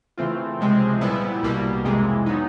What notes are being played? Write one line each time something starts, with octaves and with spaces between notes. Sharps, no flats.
C#3 E3 A3 C4 F4
C#2 C3 F3 G#3 C4
A#2 G3 B3 E4
C2 B2 G3 A#3
F2 C3 E3 G#3
F#3 B3 D#4